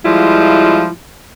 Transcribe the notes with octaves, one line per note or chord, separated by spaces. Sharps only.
F3 G3 G#3 E4 F4